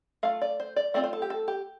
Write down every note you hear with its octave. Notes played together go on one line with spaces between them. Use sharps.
A3 F4 F5
D5
C5
D5
A3 C4 F4 D5
C5
A4
G4
A4
G4